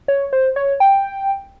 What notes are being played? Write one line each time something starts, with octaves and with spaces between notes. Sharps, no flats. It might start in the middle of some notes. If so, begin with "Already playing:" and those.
C#5
C5
C#5
G5